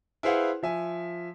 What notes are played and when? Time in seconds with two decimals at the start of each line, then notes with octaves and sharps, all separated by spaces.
0.23 E4 G#4 B4 C5 F5 F#5
0.63 F3 E5 G#5